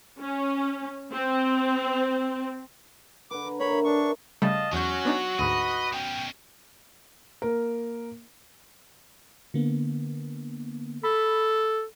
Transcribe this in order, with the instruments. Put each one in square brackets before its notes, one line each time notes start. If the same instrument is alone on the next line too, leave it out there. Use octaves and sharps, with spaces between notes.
[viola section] C#4
C4
[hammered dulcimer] D3 B4 [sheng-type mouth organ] D6
[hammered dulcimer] A#5
[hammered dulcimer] D4 A#4 B4 [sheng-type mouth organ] C#5 B5
[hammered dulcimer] E5
[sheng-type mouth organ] D4 C#6 [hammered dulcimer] G#4 C#5
[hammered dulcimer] A#4
[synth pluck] C#3 G3 A3 [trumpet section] D#5 F5 A5
[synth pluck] E2 G6 [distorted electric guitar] F#3 [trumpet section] C#4 [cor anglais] F#4
[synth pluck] B3 D4 D#4
[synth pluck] D2 G#2 [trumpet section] B4 B5 D#6 [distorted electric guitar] D#5
[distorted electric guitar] B2 C#4 [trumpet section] G5
[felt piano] A#3 A#4
[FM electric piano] D3 A#3 B3
[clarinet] A4 [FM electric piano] B5